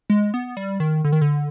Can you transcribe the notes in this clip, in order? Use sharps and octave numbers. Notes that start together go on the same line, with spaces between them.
G#3
B3
G3
D#3
D3
D#3
D3